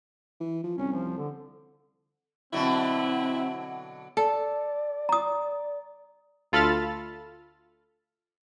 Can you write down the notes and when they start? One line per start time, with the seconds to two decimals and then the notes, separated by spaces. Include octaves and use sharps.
0.41 E3
0.64 F3
0.78 C2 C#4
0.93 F3
1.18 D3
2.53 B2 D3 F#3 C4 E4
4.17 A4 D5
5.09 A#5 D#6
6.52 D2 F4 A4 B5 F6 A6